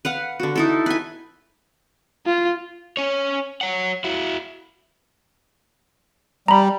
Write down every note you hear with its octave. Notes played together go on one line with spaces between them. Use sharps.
B4 F5 F#5
D3 F#4
D#4 E4 A4
B4 G#5
F4
C#4 C#5
C#5 F#5
E4 F#4
G3 A#5 B5